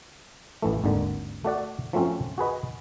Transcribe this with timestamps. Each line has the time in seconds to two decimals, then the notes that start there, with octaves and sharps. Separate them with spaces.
0.62 A1 E3 A3
0.84 G#1 D#2 D3
1.45 A3 F#4 D5 F#5
1.93 F3 F#3 A3 C4 C#4
2.38 F#4 G#4 B4 D#5